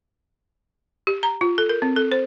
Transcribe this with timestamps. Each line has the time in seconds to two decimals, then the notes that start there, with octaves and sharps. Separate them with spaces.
1.07 G4
1.23 A#5
1.41 F4
1.58 A4
1.69 A#4
1.82 C4
1.96 A4
2.12 C5